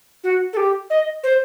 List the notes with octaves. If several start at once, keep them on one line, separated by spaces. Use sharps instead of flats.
F#4
A4
G4
D#5
C5